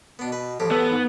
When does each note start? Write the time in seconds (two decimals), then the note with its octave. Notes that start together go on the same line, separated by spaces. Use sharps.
0.19 B2 B3 D4
0.32 B4
0.60 A1 A2 F3 G4
0.71 B3 A4
0.91 G#2